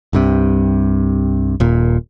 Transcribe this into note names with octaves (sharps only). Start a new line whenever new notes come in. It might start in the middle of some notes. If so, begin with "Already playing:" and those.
C2 G2 C3
D#1 A#2